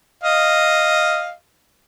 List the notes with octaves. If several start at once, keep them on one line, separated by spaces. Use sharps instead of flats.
D#5 F5